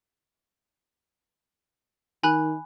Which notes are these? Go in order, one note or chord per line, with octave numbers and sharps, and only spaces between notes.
D#3 G#5 B5 F#6